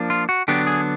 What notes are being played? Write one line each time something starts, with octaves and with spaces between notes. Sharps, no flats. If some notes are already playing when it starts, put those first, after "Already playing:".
Already playing: F3 A#3 D4
F4
F#4
D3 F#3 B3 D4 G4
G#4